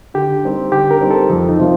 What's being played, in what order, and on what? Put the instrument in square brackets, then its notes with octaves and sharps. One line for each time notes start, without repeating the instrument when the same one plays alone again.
[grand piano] D3 [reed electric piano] G4
[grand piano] G3 C4 D#4
[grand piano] D3 [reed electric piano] G4
[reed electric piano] A#4
[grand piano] G3 C4 D#4
[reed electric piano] A4
[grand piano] F2
[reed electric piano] D#4
[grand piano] C3 F3 C4 F4